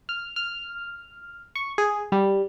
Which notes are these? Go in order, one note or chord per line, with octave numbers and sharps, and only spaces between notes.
F6
F6
C#6
G#4
G3